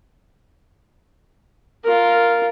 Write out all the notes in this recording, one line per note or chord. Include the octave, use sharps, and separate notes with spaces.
F4 A#4